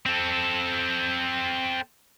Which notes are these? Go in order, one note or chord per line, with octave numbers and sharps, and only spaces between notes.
C4 A4